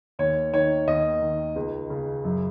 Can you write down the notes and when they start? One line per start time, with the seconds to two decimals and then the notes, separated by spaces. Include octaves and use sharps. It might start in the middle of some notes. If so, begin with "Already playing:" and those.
0.19 D#2 C#5
0.53 D#3 C#5
0.87 D#2 D#5
1.22 D#3
1.56 C#2
1.90 C#3
2.25 F#2